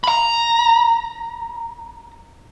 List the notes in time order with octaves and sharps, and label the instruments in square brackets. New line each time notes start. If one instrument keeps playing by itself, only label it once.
[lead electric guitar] A#5 B5